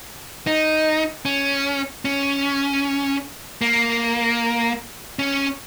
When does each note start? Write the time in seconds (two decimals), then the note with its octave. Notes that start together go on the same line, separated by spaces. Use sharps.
0.47 D#4
1.25 C#4
2.05 C#4
3.61 A#3
5.19 C#4